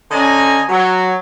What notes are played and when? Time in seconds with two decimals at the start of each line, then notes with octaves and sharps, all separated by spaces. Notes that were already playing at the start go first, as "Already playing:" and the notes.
0.11 D3 C#4 D#5 G#5 A#5
0.69 F#3